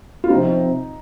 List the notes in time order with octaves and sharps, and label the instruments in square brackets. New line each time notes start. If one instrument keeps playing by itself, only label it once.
[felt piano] F4
[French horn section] C3 F3 C4 [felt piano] D#4